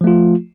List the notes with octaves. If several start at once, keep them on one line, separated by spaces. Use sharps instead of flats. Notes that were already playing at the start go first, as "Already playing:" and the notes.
F3 A3 F4